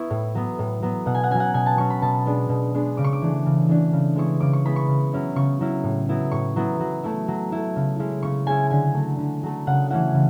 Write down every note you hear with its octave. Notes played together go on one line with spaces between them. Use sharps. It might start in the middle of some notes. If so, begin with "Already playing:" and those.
Already playing: B3 E4 C#6
A2
F#3 B3
A2
F#3 B3
B2 F#5
G#5
F#5
F#3 C#4 G#5
F#5
B2 G#5
A5
F#3 C#4 C#6
B5
B2 A5
G#3 B3 D4
B2
G#3 B3 D4
C#3 D6
C#6
D6
E3 A3 D4
C#3
E3 A3 D4
C#3
G#3 B3 E4 C#6
C#3 D6
C#6
G#3 B3 E4 B5
C#6
C#3
F#3 C#4 E4
C#3 C#6
F#3 C#4 E4
A2
F#3 B3 E4
A2 C#6
F#3 B3 E4
F#3
A3 E4
F#3
A3 E4
C#3
G#3 C#4 E4
C#3 C#6
G#3 C#4 E4 G#5
D3 G#5
F#3 A3
D3
F#3 A3
C#3 F#5
E3 A3 C#4 E4 F#5
C#3